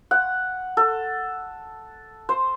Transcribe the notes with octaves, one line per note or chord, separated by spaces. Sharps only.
F#5
A4
C5